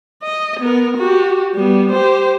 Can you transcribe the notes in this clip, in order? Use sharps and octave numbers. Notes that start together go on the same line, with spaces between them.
D#5
B3 A#4
F#4 G4
G3 B3
G4 C5